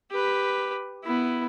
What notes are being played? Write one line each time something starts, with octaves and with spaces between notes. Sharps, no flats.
G4 B4
B3 E4